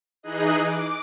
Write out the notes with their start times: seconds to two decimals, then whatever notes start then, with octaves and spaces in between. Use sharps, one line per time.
0.23 E3 D#4 G#4 D#5 F#6
0.63 D6